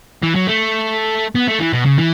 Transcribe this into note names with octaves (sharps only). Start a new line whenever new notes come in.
E3
F#3
A3
B3
A3
E3
B2
C#3
E3